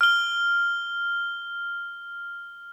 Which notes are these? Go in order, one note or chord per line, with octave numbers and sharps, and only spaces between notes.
F6 G7